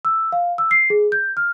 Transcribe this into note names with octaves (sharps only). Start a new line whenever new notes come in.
E6
F5
E6
C7
G#4
G6
F6